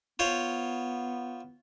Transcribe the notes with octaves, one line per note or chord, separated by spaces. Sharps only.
B3 F4 C5 C#5